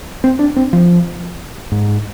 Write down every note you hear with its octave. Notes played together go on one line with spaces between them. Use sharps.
C4
D4
C4
F3
G#2